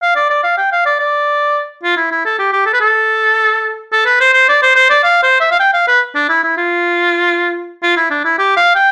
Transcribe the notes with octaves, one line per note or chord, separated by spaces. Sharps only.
F5
D5
D5
F5
G5
F5
D5
D5
F4
E4
E4
A4
G4
G4
A4
B4
A4
A4
B4
C5
C5
D5
C5
C5
D5
F5
C5
E5
F5
G5
F5
B4
D4
E4
E4
F4
F4
E4
D4
E4
G4
F5
G5